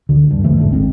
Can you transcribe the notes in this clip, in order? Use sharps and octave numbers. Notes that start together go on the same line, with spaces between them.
D2 D3
G2
D1 D3 E3 A3
E1 A1 G#2 D3
G#1 G#2 D#3 C4